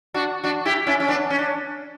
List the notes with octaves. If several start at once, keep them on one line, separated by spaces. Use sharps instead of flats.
D4 F#4
D4 F#4
E4 G4
C#4 E4
C#4
B3 D4
C#4
D4